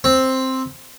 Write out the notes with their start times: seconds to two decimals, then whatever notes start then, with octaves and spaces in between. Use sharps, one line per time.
0.04 C4